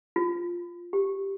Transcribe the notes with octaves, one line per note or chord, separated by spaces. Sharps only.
F4
G4